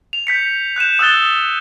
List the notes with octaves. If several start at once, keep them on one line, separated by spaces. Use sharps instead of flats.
F7
G6 B6 C#7
F#6 G6 D#7 E7
D#6 E6 F#6 A6 G7